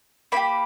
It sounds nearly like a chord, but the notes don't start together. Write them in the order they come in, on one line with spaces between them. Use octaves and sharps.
A#3 E4 B5 G4